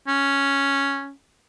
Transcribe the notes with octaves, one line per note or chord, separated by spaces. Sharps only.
C#4